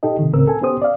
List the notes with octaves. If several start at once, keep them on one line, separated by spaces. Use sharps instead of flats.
A#2 D#4 G4 A4 D#5
C3 D#3
C#2 A2 C#3 C4 A#4 E6
A4 G#5
B3 C#4 G4 C5 D#6
D5 F5